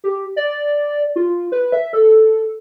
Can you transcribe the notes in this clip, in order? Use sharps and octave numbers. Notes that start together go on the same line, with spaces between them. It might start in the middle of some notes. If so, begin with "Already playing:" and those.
G4
D5
F4
B4
E5
A4